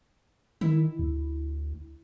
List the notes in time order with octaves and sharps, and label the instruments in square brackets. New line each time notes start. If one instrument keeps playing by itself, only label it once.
[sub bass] D#3 [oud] E4
[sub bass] D2